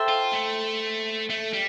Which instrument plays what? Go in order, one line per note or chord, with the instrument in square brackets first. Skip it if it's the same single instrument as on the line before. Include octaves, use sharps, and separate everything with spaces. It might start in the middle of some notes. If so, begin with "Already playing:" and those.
Already playing: [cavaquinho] A4 C5 E5 G5
[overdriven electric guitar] F4
A3
A3
G3